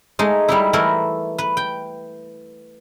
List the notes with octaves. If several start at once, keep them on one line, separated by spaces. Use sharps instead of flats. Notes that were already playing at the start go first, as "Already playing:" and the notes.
G#3 A3 D#4
G3 D#4 E4
E3 A3 E4 A#4
B4
G5